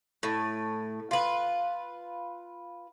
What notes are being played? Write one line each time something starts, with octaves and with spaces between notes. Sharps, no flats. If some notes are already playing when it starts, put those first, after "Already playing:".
A2
F4 B4